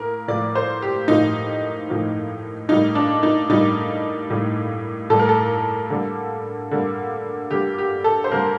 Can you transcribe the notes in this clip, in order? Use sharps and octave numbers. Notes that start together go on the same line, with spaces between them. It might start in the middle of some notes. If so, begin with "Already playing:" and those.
Already playing: A2 A#3 A#4
A2 F3 A#3 D5
C5
G4
A2 F3 A#3 D#4
A2 F3 A#3
A2 G3 A#3 D#4
D4
D#4
A2 G3 A#3 D#4
A2 G3 A#3
A2 G3 A#3 A4
A#4
A4
D3 G3 A#3
D3 G3 A#3
D3 G3 A#3 G4
G4
A4
C5
D3 G3 A#3 A#4